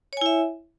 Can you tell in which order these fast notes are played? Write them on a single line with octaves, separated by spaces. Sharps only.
C#5 G#5 E4 E5